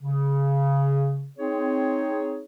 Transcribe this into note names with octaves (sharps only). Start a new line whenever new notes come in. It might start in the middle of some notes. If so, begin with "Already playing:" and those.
C#3
C4 D#4 G#4 C#5